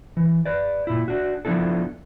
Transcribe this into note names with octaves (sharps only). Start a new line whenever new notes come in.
E3
B4 D5
A#2 E4
D4 F#4
F3 B3 D4 E4 A4